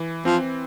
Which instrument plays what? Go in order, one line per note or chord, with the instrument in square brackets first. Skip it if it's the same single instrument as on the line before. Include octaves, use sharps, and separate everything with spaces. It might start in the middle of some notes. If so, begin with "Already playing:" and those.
Already playing: [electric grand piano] E3
[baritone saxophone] F3 [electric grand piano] C4